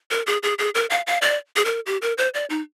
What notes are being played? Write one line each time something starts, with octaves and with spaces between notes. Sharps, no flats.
A#4
G#4
G#4
G#4
A#4
F5
F5
D5
G#4
A#4
G4
A#4
C5
D5
D#4